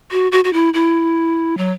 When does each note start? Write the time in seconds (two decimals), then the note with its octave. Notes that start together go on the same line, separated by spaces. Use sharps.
0.11 F#4
0.32 F#4
0.44 F#4
0.53 E4
0.74 E4
1.58 F#3